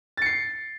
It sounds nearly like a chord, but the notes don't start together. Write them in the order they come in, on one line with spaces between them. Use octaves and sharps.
A6 C#7 C7